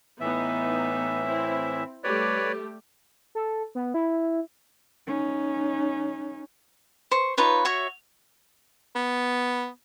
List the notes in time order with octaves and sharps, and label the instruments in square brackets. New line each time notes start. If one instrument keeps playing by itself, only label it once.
[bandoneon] A2 E3 E5 [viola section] B3 D#4
[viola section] C4 E4
[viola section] G3 A3 G4 [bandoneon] B4 C#5 D5
[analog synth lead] A4
B3
E4
[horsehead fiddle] C#4 D#4
[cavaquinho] C5 C#6
D#4 F4 B4 C#5
F#4 C#5 E5
[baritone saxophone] B3